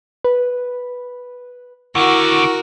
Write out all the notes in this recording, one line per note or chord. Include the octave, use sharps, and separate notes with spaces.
B4
D#2 D3 E4 F#4 A#4 F#5 C#6